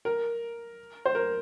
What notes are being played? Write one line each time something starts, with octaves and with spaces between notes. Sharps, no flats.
A#4
C5
A#4